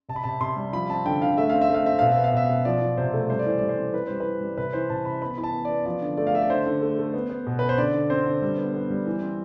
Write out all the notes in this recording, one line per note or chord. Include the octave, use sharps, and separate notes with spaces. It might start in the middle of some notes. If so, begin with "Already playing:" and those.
C3 A5
B5
C3 A5
C3 C6
G3
F3 B5
C4 A5
D3 G5
D3 F5
A3 E5
C4 F5
E5
A3
F5
C4 E5
B2 F5
E5
B3
F5
B2 E5
B2
F3 D5
F3
C3 C5
A3
G3 C5
D5
E3 C5
G3 D5
C5
C4
E3 B4
G3 C5
B4
E3
G3
C3 B4
E3 C5
C3 A5
C3 B5
B3 B5
E3 B5
A5
B3
B3 D5
F3 D5
D3
A3 D5
F5
A3 E5
D5
D3 C5
D3
A3
A3
B3
B3
B2
B3 B4
C5
D3 D5
D3
C4 C5
D3
G3
B3
B3
G3
E3
C4